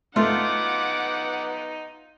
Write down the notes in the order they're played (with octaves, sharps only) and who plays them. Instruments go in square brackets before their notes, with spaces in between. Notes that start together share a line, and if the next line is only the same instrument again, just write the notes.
[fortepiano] A3 [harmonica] B3 D#4 [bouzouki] F4 [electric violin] F#5 D6